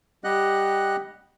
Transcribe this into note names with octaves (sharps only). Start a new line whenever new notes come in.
G3 G4 D#5 F#5 F#6